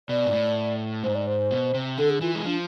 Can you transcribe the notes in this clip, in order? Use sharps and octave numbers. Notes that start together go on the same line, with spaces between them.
B2 D5
G#2
A2
G#2 C5
D5
C5
B2
C3
D3 A4
G#4
E3 F4
G#3 E4
F3 D4